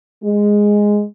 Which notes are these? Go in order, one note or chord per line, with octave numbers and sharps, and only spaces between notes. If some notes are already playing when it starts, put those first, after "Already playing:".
G#3